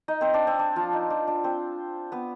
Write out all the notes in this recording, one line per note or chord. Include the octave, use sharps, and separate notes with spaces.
D#4 D#5
C4 C5
D4
C4
D4
F3 F4
D#4
D4
D4
C4 C5
B3 B4